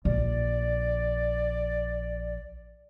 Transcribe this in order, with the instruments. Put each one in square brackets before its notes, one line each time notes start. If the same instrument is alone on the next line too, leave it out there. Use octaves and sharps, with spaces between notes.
[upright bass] A#1 [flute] D5